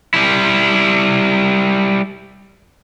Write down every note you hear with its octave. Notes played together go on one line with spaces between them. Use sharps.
G3 E4